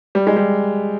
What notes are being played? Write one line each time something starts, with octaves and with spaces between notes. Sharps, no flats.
G3
G#3
G3